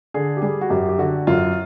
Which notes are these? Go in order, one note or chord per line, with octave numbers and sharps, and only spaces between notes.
D3 G#4
G4
G3 G#4
F#4
F#2 G4
G4
D3 F#4
F#2 F4